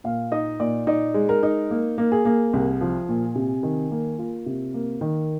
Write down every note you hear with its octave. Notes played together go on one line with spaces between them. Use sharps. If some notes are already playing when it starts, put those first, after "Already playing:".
A#2 F5
D#4 D#5
A#2 D5
D#4 D5
G#3
A#4
D#4
A#3
A#3
G#4
A#3
C2
F3
A#2
C3
D#3
A#3
A#3 F4
C3
A#3
D#3